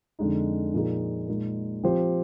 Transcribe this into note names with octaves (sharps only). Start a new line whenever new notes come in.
F2 D3 G#3 D#4
A#2 F3 A#3 D#4 G#4
A#2 G#3 D#4
F3 C4 G4 C5